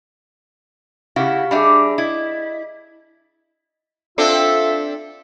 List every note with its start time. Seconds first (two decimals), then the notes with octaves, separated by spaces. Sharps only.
1.16 C#3 E4 F#4 G4 F5
1.51 G3 D4 G#4 E5 B5
1.98 E4 D#5
4.18 C4 D4 F4 A4 E5